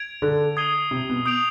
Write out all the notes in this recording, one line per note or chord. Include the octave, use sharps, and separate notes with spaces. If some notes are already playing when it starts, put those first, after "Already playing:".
Already playing: G#6 D7 F7
D3
D#6 G#6 C7 D#7 G7
C3
B2
D#6 G6 D7 F7